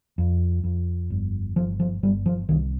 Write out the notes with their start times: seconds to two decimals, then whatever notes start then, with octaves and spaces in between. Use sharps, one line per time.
0.18 F2
0.64 F2
1.10 G1
1.56 G1 F3
1.80 F3
2.03 G1 G3
2.26 F3
2.49 C2 D#3